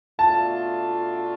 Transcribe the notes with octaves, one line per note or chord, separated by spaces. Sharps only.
B2 A3 D4 F4 A5